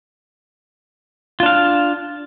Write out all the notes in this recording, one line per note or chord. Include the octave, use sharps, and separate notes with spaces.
D4 F4 F5